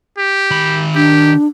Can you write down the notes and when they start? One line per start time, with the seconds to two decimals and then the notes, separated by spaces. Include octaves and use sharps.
0.18 G4
0.51 D#3 B5
0.95 D4 G4